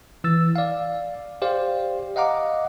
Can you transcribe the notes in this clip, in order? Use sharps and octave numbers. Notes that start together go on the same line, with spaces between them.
E3 E6 A6
D5 F5
G4 C5 D5 F5
D#5 F5 F#5 A#5 D6